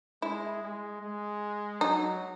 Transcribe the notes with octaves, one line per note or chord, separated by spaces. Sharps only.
G#3 E4
G#3
G#3
F#3 D#4